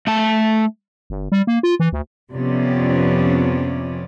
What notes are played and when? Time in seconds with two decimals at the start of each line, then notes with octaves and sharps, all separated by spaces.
0.07 A3 A5
1.10 G1
1.32 G3
1.47 A#3
1.63 F4
1.80 E3
1.93 D2
2.31 F2 C3 B3 C#4 D5